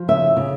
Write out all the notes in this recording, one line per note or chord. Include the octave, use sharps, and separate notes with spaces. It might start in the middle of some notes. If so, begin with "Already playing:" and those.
Already playing: F3
C#3 E5
C#3